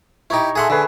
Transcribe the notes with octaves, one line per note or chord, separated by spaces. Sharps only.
D#4 E4 G4 C#5
A3 G#4 E5 F#5 G#5 C6
D3 G#4 B4 E5